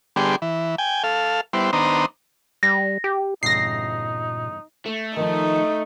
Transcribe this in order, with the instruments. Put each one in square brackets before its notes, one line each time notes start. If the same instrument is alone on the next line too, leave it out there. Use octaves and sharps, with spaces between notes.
[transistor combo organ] D3 G3 B3 G4 G#4 C6
E3
G5 G#5
A4 F5
G3 B3 E4 C5
D#3 B3 D4 C5 A#5 D#6
[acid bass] G3 [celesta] A#6
[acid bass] G4
[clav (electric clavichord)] E2 G2 C#3 [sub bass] A#2 [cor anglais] D#4 [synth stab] A#6 C7
[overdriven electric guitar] A3
[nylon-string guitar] D#3 F3 [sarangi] D#4